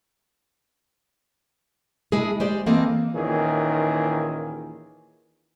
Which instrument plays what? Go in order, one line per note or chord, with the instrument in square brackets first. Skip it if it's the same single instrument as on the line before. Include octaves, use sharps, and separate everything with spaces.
[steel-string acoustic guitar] G#3 D4 E4 G#4
G#3 G4 C5 D5
E3 A#3 C4 A4 D#5
[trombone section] D#2 A#2 D#3 E3 C#4 G#4